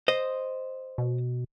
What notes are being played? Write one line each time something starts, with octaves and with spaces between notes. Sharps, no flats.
C5 D#5
B2